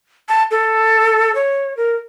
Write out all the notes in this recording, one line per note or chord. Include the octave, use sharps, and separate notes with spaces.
A5
A4
C#5
A#4